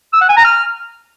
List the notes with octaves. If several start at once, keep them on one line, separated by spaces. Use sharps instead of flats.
E6
F#5
G#5
A#5
F6